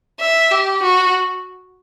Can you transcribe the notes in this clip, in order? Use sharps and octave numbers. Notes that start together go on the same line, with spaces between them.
E5
G4
F#4